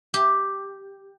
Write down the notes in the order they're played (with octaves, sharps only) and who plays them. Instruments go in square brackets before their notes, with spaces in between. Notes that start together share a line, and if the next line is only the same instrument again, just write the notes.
[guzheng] G4